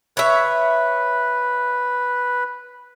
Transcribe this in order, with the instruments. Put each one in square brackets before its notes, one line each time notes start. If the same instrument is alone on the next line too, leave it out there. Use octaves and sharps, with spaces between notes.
[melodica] B4 [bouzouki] C#5 E5